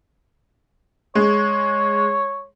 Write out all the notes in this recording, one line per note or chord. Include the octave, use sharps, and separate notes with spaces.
G#3 C#5